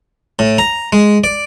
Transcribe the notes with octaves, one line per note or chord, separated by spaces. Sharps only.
A2
A#5
G#3
D5